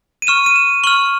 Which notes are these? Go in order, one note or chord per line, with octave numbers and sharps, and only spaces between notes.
D#7
C#6 F6 E7
D#7
E7
C#6 F6 F#7